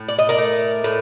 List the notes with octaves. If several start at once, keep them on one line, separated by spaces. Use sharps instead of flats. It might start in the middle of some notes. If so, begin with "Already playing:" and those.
Already playing: A2
D5
D#5
A#4 D5
A3
A2